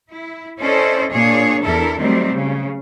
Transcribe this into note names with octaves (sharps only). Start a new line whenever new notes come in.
E4
C#4 E4 A4 C5 D5 D#5
A#2 A#3 D4 G#4 C#5
E2 D4 E4 A4 A#4
D#3 F#3 G3 A3 C4
C#3